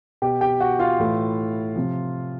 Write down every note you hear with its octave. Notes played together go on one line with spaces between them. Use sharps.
B2 G4 G5
G4 G5
F#4 F#5
F4 F5
A2 E3
C3 F3